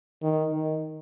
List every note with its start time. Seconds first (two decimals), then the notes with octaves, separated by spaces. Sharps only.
0.22 D#3
0.53 D#3